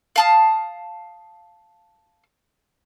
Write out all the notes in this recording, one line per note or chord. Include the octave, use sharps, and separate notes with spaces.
F5 A5 D#6